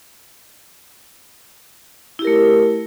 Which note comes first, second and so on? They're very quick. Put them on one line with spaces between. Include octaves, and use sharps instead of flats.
E4 G4 A#4 A3